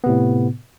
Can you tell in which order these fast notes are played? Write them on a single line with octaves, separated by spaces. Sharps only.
B3 C3 A2